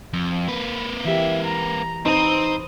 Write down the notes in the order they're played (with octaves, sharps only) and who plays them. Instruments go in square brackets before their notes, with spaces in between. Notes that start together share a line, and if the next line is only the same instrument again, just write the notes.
[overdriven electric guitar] F2
A#3 B4
[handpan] E3 G4 [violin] E5
[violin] A#5
[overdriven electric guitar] C4 [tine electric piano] D#4 A#5 [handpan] B4 C5 [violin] D#6